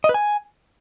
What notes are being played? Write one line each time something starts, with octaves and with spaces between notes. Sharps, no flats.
D#5
B4
G#5